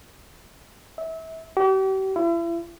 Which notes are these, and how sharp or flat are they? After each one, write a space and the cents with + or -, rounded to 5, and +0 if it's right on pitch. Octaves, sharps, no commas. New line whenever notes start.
E5 -30
G4 -40
E4 +40